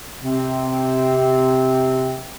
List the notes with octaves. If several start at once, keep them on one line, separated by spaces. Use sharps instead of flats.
C3 C4